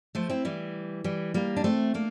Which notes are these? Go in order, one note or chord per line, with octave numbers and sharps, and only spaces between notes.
F3 A3
C4 E4
E3 G3
E3 G3
G3 A#3
D4
A3 C4
A#3 D4